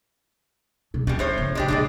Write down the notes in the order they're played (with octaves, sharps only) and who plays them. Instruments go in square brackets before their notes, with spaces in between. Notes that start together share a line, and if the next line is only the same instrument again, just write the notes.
[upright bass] B2 F#3
[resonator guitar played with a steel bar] B2 G3 [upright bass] C#4
[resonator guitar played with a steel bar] A2 C5 C#5
[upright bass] F#1 F#2
[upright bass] A#2 C#3 [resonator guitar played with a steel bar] G#3 D4 G4
[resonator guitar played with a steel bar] B2 G#3 D4